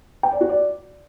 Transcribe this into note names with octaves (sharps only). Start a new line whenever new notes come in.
G5
D5
F#4
D5